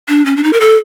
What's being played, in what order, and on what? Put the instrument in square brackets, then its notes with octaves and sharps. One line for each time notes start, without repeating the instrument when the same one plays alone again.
[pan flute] D4
C#4
D4
D#4
A#4
A4